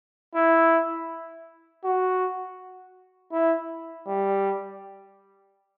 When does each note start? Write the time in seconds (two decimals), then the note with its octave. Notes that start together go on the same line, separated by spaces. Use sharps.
0.35 E4
1.84 F#4
3.32 E4
4.07 G3